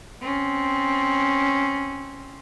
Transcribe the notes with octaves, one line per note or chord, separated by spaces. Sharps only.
C4 C#4